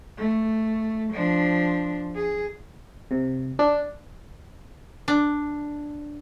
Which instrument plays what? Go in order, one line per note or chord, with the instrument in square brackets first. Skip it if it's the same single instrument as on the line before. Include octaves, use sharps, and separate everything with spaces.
[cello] A3
F3 D4
G#4
[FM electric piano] C3
D4
[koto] D4